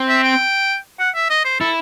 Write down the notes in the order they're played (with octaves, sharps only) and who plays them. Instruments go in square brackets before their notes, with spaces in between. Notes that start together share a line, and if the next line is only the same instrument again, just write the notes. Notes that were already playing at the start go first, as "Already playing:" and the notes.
Already playing: [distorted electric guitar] C4
[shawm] E5
G5
F#5
E5
D#5
C5
[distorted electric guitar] E4 [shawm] A4